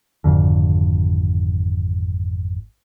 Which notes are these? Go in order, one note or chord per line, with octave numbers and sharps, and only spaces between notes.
G#1 F2 D3